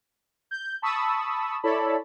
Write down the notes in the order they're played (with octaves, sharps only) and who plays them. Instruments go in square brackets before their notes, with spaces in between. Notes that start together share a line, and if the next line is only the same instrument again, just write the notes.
[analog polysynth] G6
A5 B5 C#6 D#6 E6
E4 A4 C#5 D5 A5 B5